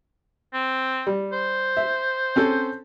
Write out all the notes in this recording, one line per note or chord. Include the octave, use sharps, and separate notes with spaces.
C4
G3
C5
E5
C4 C#4 A4